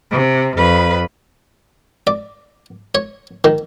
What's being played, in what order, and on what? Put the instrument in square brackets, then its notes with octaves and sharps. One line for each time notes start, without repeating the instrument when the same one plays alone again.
[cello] C3
F2 B4
[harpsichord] D5
C#5
D#3